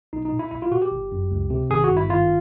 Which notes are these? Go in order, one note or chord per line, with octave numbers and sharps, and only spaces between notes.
B1 D#4
D#4
A#2
E4
B1 E4
F4
A#2 F#4
G4
G1
F#2
C#2
C3
G#1 G#4
F#4
G2
E4
G#1 F4